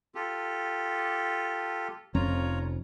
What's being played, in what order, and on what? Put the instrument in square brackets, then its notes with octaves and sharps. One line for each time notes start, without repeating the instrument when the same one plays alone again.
[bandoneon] F4 G4 A4
[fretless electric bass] F1 F2 C#4 [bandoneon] F4 C#5 A#5